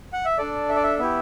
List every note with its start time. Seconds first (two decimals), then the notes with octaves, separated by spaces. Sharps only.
0.13 F#5
0.25 E5
0.38 D4 A4 D5
0.69 E5
0.76 D5
0.83 E5
0.99 B3 E4 G4 E5